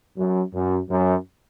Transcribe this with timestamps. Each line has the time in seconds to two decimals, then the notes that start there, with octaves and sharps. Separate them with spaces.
0.17 F#2
0.54 F#2
0.89 F#2